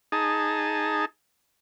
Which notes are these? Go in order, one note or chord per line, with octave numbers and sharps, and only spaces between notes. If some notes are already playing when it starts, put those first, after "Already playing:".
D#4 G#4 A5